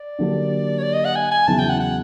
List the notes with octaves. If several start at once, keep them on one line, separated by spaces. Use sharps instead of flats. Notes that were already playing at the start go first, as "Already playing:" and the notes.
Already playing: D5
D3 F#3 A#3 D4 G4
C#5
D5
D#5
F#5
G#5
G#5
E2 C#3 F#3 B3 E4 A5
G5
F#5
F#5